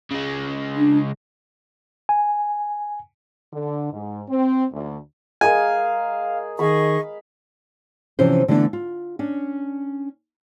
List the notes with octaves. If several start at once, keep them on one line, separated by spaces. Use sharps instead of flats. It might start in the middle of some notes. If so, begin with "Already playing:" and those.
C#3 G#3
D4
G#5
D3
G#2
C4
D2
G#3 G#4 A#4 F5 G#5
D#3 G#4 D#5 F5 B5 C#6
C3 E3 F3 C#4 C5
D3 E3 A3 B3 D4
F4
C#4 D4